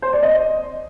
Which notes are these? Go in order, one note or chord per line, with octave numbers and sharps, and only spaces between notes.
C5
D5
D#5